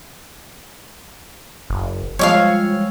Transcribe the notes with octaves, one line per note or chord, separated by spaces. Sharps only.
F#1
F3 G3 G#3 C#5 D5 F5 E6